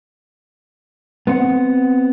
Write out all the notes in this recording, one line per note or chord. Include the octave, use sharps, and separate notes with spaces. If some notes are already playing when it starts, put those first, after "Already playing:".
B3 C4 F#5